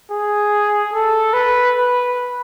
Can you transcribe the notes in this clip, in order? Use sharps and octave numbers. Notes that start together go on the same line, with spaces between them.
G#4
A4
B4
B4